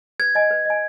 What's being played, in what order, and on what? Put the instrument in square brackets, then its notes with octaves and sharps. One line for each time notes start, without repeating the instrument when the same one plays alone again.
[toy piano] B4 [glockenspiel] G#6
[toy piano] D#5 G#5
B4
D#5 G#5